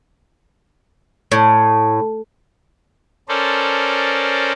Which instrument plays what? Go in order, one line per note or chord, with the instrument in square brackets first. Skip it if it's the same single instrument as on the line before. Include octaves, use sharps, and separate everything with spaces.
[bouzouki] A2
[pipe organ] C#4 A4 A#4 C5 D5